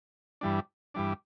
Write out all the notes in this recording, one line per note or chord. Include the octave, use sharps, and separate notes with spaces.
G2 E3 G3 D4
G2 E3 G3 D4